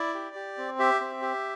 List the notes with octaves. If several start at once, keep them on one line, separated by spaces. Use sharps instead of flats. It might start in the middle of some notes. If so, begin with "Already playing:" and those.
Already playing: E4 D5
G4
G4
C4
G4 E5
C4
G4